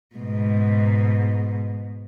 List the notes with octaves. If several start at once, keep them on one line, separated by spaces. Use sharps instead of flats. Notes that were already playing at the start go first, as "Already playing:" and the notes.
G#2 B2